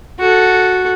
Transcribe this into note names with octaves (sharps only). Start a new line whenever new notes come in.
F#4 A4